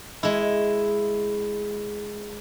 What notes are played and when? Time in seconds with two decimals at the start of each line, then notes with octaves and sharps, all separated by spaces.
0.23 G#3 E4